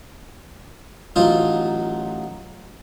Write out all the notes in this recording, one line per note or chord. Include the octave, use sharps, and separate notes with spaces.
A1 F#3 D#4 F4